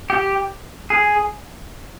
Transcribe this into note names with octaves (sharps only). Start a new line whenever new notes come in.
G4
G#4